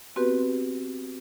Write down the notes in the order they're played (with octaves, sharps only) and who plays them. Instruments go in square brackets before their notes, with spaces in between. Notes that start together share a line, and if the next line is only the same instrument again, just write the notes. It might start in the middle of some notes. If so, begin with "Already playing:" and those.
[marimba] B3 C4 F#4 G4 B4